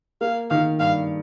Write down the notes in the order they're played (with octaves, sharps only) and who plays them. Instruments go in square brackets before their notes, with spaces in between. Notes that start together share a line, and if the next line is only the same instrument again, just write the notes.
[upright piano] A#3 [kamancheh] F5
[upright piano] D#3 [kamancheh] F5
[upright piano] G2 [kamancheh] F5